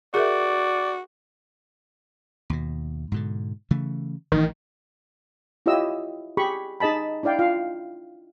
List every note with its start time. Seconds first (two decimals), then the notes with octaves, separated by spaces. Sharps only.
0.14 F#4 G#4 A#4 D5 E5
2.50 D#2 B2
3.12 G#2 B2 D3
3.71 C#3 E3 A3
4.32 A1 D#3 E3
5.66 E4 F4 G4 C#5 D#5 E6
6.37 G4 G#4 B5 C#6
6.80 D#4 G#4 D#5 A5 B5
7.23 D4 E4 D5 F5 G5
7.39 F4 F5